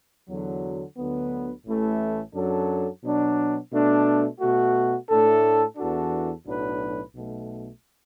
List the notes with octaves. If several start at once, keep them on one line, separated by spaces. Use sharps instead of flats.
E2 D3 F#3
D2 D3 F#3 B3
A1 A2 E3 A3 E4
F#2 F#3 D4 A4
B2 F#3 D4
B2 A3 D4
B2 A3 F#4
A2 A3 D4 A4
E2 E3 D4 F#4 A4
B1 A2 F#3 D4 B4
B1 B2 A3